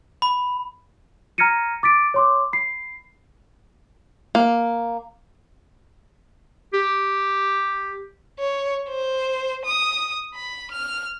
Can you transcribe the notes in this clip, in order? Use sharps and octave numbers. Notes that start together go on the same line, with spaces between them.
B5
A#5 F6 G#6 A#6 C#7 D#7
D6 A6 B6 D7
C#5 C6 D6
B5 C7
A#3
G4
C#5
C5
D#6
B5
F6